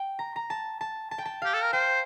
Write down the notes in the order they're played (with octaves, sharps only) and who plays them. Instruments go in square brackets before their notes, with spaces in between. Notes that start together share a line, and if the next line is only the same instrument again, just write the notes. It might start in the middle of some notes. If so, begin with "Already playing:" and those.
Already playing: [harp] G5
A#5
A#5
A5
A5
A5
G5
A5
[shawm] G4 [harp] F5
[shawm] A4
A#4
[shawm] C5 [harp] G5